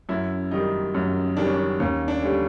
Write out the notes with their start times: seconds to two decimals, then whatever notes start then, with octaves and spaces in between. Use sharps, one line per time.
0.09 F#2 E4
0.51 D#3 G3 D#4
0.95 F#2
1.37 D#3 G3 D4
1.45 C#4
1.54 D4
1.80 D#2 C#4
2.08 D4
2.22 D3 G3 C#4